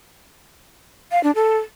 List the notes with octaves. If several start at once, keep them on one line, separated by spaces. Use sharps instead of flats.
F5
D4
A4